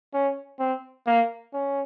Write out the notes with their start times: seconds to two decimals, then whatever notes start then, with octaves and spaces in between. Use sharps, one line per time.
0.14 C#4
0.59 C4
1.07 A#3
1.53 C#4